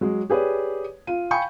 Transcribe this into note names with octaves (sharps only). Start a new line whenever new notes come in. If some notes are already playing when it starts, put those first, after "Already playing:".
F#3 G#3
G4 G#4 B4 C#5 D5
F4 D#7
F5 G5 G#5 B5 C#6 G6